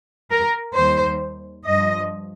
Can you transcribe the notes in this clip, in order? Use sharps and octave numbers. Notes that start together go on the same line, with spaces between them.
A#4
D#2 D#3 G3 C5
G2 F3 D#5